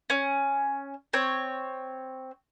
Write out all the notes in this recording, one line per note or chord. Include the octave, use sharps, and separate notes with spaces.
C#4
C4 C#5